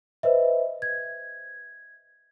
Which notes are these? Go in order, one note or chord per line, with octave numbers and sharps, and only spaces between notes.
B4 C5 D#5 E5
G#6